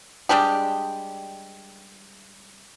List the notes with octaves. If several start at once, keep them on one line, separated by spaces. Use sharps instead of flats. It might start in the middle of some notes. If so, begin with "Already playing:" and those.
G3 G#3 D4 G4